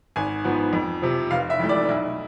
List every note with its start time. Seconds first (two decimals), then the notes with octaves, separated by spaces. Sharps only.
0.16 G#1 G#5
0.44 G#2 F3 B3
0.73 F2
1.02 C3 F3
1.31 F1 F5
1.50 E5
1.60 F2 E3 A3
1.69 D5
1.89 B1 E4